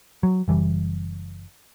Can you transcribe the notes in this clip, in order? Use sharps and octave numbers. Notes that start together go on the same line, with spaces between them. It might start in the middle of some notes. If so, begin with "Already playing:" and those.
F#3
F#1 E3 G3